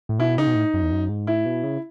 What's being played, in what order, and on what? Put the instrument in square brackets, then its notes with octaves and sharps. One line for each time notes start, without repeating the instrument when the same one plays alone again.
[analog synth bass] A2
[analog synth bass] B2 [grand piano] E4
[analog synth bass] C#3 [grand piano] D#4
[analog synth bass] B2
A2
F#2
E2
F#2
G#2
[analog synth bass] A2 [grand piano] E4
[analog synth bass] B2
C#3